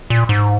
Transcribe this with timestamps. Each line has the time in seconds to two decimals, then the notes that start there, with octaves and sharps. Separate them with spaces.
0.10 A#2
0.29 G#2